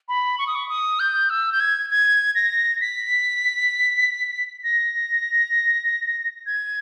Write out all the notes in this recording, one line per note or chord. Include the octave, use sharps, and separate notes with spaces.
B5
C#6
D#6
C#6
D#6
G6
E6
G6
G#6
G#6
A#6
B6
A#6
G#6